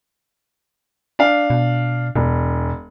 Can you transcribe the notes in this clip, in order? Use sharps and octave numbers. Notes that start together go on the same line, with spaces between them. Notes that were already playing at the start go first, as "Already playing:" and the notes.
D4 F5
B2
E1 B2